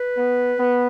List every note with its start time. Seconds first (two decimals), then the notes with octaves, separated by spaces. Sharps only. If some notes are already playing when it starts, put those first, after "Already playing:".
Already playing: B4
0.18 B3
0.59 B3